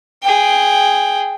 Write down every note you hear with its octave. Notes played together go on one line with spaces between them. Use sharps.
G#4 G5